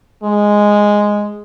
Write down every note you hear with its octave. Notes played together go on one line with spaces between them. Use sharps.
G#3